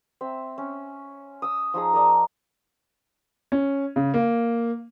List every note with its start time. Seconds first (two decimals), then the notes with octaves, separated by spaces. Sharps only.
0.21 C4 E5
0.58 C#4
1.42 D#6 E6
1.74 F3 D#4 G#4 D#6
1.93 A#4 D5 D#5 A5
3.52 C#4
3.96 C#3
4.14 A#3